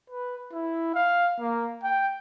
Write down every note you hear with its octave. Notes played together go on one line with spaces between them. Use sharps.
B4
E4
F5
A#3
G5